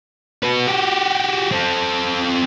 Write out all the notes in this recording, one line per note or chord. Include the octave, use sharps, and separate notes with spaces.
F#4 B4
F#4 G4
C4 A4